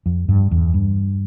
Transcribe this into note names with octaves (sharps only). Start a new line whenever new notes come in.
F2
G2
E2
G2